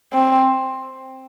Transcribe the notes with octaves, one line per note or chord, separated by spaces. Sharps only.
C4